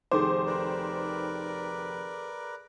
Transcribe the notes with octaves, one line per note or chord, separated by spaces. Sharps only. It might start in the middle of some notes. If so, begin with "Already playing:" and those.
F1 D#3 G#4 A4 C5 D6
A#4 B4 D5